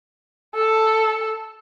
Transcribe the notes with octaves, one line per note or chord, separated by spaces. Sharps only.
A4